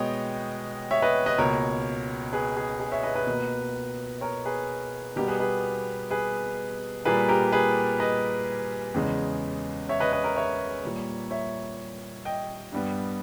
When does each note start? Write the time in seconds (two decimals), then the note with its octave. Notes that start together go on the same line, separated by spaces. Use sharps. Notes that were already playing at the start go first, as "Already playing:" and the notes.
Already playing: B2 G#3 B3 C#5 D#5 G5
0.91 C#5 E5
1.02 B4 D#5
1.26 B4 D#5
1.38 C#2 B2 A#3 A#4 C#5
2.33 G#4 B4
2.57 G#4
2.80 G#4
2.92 C#5 E5
3.03 B4 D#5
3.15 B4 D#5
3.27 B2 A#3
4.21 A#4 C#5
4.45 G#4 B4
5.16 B2 G3 B3 G4 A#4
5.28 G#4 B4
5.40 G#4 B4
6.11 G#4 B4
7.05 A#2 G3 A#3 G#4 B4
7.29 G4 A#4
7.52 G#4 B4
8.00 B4 D#5
8.94 E2 C#3 G#3
9.89 C#5 E5
10.00 B4 D#5
10.13 B4 D#5
10.24 A#4 C#5
10.36 C#5 E5
10.83 A#2 G3 A#3
11.31 C#5 E5
12.25 D#5 G5
12.72 G2 G3 B3